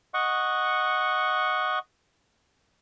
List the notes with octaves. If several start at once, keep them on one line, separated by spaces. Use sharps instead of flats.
D#5 F#5 C#6